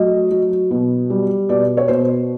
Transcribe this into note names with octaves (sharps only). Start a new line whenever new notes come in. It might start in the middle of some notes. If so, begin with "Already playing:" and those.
Already playing: F#3 A3 D#5
F#3
B2
G3
B2 D5
C#5
B2 C5